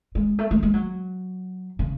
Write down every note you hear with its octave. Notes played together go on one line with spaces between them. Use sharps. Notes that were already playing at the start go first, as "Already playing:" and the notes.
G#3
A3
A3
G#3
F#3
C#3